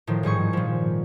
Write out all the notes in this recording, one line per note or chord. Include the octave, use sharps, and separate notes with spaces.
A2 D#3 F3
G#2 G3 G#4 C#6
A#2 F3